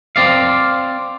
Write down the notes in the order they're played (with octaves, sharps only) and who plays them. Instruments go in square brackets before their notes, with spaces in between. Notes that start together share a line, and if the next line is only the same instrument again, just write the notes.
[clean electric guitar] C4 D5 F5